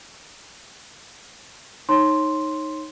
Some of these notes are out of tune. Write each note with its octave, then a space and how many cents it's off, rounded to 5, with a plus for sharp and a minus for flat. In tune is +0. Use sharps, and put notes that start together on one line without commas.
D#4 +0 C#5 -25 C6 +0